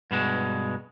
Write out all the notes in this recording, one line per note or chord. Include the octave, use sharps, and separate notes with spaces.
G2 B2 G#3